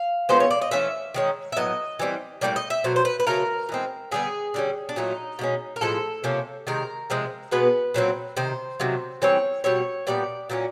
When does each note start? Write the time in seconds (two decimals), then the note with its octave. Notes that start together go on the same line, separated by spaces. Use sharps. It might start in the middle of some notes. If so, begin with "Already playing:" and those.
Already playing: F5
0.29 D3 F3 G#3 B3 C5
0.40 C#5
0.50 D5
0.62 D#5
0.71 E3 A3 C#4 E5
1.14 D#3 G#3 C#4
1.52 E5
1.56 A2 F#3 B3 D#5
1.99 E3 G3 C4
2.41 A2 E3 G3 A#3 D5
2.56 D#5
2.70 E5
2.84 B2 F#3 A3 C5
2.96 C5
3.05 B4
3.20 B4
3.27 C#3 F#3 A3 A#4
3.69 E3 G#3 C4
4.11 D3 G3 B3 G#4
4.54 D3 G3 A#3 C#4
4.89 D4
4.96 A#2 F#3 A3 D#4
5.39 B2 G#3 C#4
5.76 A#4
5.81 A2 F3 G#3 A4
6.24 C3 F3 A#3 C#4
6.67 C3 D#3 G#3 A#4
7.10 C3 F3 G#3 C4
7.51 B2 G#3 B3 B4
7.94 A#2 F#3 A3 C4
8.37 C3 D#3 C5
8.80 C3 D#3 F#3 A3
9.22 E3 G3 C4 C#5
9.64 B2 G3 C4 C#5
10.07 A#2 G3 B3 D5
10.50 A#2 F#3 A#3 C#4